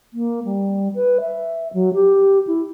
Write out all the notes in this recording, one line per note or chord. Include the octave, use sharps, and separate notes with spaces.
A#3
G3
B4
E5
F#3
G4
E4